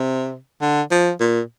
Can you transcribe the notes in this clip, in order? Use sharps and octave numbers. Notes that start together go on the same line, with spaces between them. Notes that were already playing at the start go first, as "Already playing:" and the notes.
Already playing: C3
D3
F3
A#2